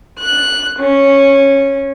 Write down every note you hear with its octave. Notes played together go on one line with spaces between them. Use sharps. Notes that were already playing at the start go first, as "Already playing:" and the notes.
F#6
C#4